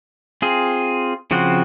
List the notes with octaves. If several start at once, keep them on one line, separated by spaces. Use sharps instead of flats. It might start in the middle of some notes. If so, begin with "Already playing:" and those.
C4 F4 G#4
C#3 F3 C4 F#4